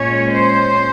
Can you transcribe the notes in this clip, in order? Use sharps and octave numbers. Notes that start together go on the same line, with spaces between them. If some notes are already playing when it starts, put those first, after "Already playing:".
Already playing: A#2 G#3 C#4 C#5
C5